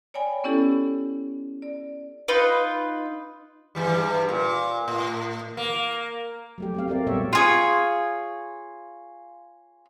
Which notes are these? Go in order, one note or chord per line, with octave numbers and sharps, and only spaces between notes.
C#5 D5 G5 G#5 B5
B3 C#4 E4 G4 A4
D5
D#4 F4 B4
G2 E3 G3
A#2
A2
A#3
F#3 A3 G4
A3 C4 F5
C4 G4 A#4 D5
A#2 G3 B3 C#5 D5 E5
F4 G#4 C#5